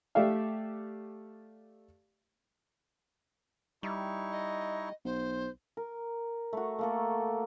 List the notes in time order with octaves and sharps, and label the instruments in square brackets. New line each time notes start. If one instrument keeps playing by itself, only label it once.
[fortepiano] A3 G4 A4 D5 E5 F5
[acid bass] G3 [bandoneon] D#4 E4 C#6
[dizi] D#5
[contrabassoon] B1 [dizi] C5
[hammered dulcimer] A#4
A3 F#4
A3 A#3 A4